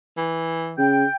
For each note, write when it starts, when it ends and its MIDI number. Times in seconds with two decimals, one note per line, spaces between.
0.17 0.79 52
0.78 1.05 49
0.78 1.16 79